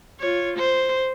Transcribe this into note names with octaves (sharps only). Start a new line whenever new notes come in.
F4 C#5
C5